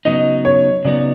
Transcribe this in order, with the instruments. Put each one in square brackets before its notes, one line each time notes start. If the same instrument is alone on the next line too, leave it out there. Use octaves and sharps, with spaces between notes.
[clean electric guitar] C#3 F#3 B3 D#4 [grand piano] D#5
[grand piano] C#5
[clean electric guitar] C#3 F#3 B3 D#4 [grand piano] D5